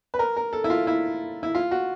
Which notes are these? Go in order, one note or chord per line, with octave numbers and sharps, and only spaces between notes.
B4
A#4
A#4
A4
E4
F4
E4
E4
F4
F#4